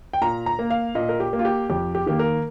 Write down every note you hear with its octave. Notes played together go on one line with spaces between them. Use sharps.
G5
A#2 A#5
A#5
A#3
F5
A#2 D#5
A#4
G4
A#3
F4
G4
F2 G4
G4
D#3 A#3 G4
A#4